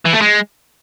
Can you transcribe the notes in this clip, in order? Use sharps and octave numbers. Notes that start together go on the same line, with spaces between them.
E3
A3
G#3